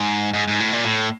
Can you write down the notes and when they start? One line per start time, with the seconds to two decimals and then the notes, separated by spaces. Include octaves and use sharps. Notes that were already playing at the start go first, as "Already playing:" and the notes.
Already playing: G#2
0.33 G#2
0.48 G#2
0.60 A2
0.73 A#2
0.85 A2